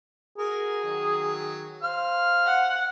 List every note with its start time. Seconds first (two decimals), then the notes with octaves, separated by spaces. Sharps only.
0.38 F#4 G#4 A#4
0.85 D#3 F#3
1.83 C5 F5 F6
2.47 F#5